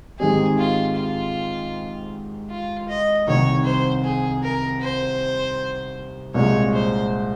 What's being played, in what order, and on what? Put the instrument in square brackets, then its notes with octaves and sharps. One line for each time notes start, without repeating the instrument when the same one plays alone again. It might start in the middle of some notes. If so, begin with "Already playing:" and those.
[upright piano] G#2 D#3 G#3 C4 G4 [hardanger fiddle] G#4
[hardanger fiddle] F4
F4
F4
D#5
[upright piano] C2 C3 D#3 [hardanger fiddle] C#5
[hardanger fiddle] C5
G#4
A#4
C5
[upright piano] C2 A#2 G#3 [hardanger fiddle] C#5
[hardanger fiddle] C5